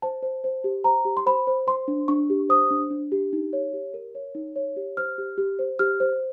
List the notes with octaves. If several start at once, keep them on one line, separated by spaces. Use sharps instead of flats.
C5 A5
C5
C5
G4
C5 A#5
G4
C6
C5 B5
C5
C5 C6
D4
D4 C#6
G4
C5 D#6
D4
D4
G4
D#4
C#5
G4
A#4
C#5
D#4
C#5
G4
C5 F6
G4
G4
C5
G4 F6
C5